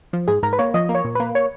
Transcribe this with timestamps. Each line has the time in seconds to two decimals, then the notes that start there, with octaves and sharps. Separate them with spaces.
0.13 F3
0.28 G#2 G#4
0.43 G#2 A#4
0.53 B4
0.59 A#3 C#5
0.74 F3 D#5
0.89 A#3
0.95 C#5
1.05 A#2
1.15 A#3 B4
1.35 C#5